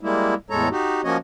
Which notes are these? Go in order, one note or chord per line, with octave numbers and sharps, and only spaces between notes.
G3 G#3 A#3 E4
E2 A2 G#3 A4 C#5 A#5
D#4 F#4 G4
F3 A#3 C#4 F#4 C#5 D#5